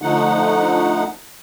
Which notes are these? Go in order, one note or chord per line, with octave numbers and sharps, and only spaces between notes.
D3 F3 A3 D#4 F#5